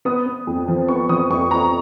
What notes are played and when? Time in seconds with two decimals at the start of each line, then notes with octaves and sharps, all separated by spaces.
0.05 B3 D#6
0.26 B3
0.47 F2
0.68 F3
0.89 B3 C#6
1.09 F3 D#6
1.30 F2 C#6
1.51 F2 A#5